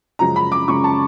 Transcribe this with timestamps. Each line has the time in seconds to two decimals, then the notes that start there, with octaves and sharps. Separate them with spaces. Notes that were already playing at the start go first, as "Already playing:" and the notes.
0.19 F#2 C#3 F3 G#3 A#5
0.36 B5
0.52 D6
0.68 F#2 C#3 F3 G#3 C#6
0.84 A5